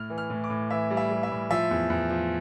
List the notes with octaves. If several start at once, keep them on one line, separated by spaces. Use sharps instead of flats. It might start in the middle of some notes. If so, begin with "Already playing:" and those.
Already playing: A2 F6
E3
F6
A2
D6
A2
E3 E5
G3
E5
G3
E5
A2
F3 E5
E2
E2
F3